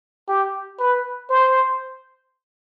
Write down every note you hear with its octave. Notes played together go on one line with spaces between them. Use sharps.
G4
B4
C5